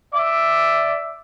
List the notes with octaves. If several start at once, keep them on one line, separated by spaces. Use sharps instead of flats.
D5 E5 D6